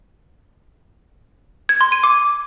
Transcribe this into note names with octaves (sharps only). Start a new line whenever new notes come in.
G#6
C6
D#7
D6